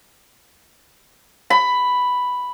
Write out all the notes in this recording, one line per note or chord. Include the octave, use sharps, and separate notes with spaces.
B5